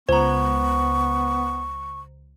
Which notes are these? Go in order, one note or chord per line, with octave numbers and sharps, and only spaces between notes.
C#2 B3 C5 A#5 C#6